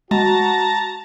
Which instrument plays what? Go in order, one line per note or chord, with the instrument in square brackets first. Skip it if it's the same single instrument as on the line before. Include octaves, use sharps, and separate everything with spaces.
[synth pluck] G#3 [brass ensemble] F#4 [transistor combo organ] A5 A#5